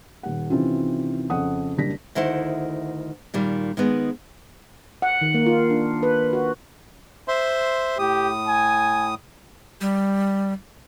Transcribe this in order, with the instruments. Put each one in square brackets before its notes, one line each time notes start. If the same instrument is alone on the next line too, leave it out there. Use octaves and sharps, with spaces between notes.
[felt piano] D#1 F#5
C3 D#3 E3 C4 C#4 F4
F2 C#3 F#5 D#6
F#1 G3 D4 A#6 B6
[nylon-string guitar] D2 D#3 E4 C5 F#5
A#2 D#3 G3
D#3 G#3 B3
[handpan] F#5
D#3
A#3
F4
D4
B4
F#4
[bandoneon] C5 E5 C6
[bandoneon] A2 D#6 [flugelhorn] G4
[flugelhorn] G#5
[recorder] G3